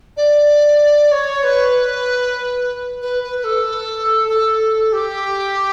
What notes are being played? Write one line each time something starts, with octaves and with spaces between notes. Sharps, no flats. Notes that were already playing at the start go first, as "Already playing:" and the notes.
D5
C#5
B4
B4
B4
A4
A4
G4